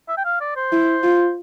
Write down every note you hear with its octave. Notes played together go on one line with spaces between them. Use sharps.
E5
G5
F5
D5
C5
E4
F4